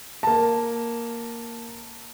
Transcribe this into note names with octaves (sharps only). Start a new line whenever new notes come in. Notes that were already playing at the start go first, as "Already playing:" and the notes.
A#3 A5